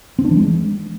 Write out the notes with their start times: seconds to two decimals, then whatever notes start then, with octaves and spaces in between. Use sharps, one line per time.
0.19 C4
0.25 D4
0.31 E3
0.37 G#3